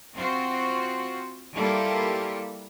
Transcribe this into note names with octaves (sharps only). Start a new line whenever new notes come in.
C4 F4 F#4 C5
G3 A#3 E4 F4 G4 A4